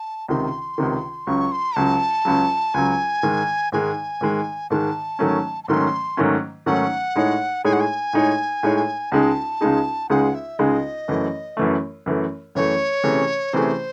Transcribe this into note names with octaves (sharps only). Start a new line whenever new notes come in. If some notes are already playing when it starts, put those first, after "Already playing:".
Already playing: A5
C#2 C3 D#3 C6
C#2 C3 D#3
C#2 C#3 F#3 C#6
C6
C#2 C#3 F#3 A5
C#2 C#3 F#3
C#2 C#3 F#3 G#5
G#2 D#3 G#3
G#2 D#3 G#3 G#5
G#2 D#3 G#3
G#2 D#3 G#3 A5
G#2 D#3 F#3 A3 C#4
A5
G#2 D#3 F#3 A3 C#4 C6
G#2 D#3 F#3 A3 C#4
G#2 D#3 F#3 A3 C#4 F#5
A2 G#3 D#4 G#4 C#5
A2 G#3 D#4 G#4 C#5 G#5
F#5
G#5
A2 G#3 D#4 G#4 C#5
A2 G#3 D#4 G#4 C#5
C#2 C#3 G#3 D#4 G#4 A5
C#2 C#3 G#3 D#4 G#4
C#2 C#3 G#3 D#4 G#4 F#5
E5
C#2 C#3 G#3 D#4 G#4 D#5
F#2 E3 A3
F#2 E3 A3
F#2 E3 A3
F#2 E3 A3 C#5
C3 E3 A3 C#4 G#4
C3 E3 A3 C#4 G#4 C5